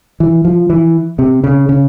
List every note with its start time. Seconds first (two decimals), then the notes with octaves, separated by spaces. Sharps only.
0.20 E3
0.45 F3
0.70 E3
1.19 C3
1.44 C#3
1.69 C#3